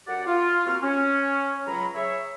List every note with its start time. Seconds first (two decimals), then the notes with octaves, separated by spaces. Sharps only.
0.07 F#2 G4 D5 F#5
0.26 F4
0.66 C3 A#3 C4 F#4 F6
0.82 C#4
1.66 C#2 F#3 A#5 B5
1.95 G#4 C#5 E5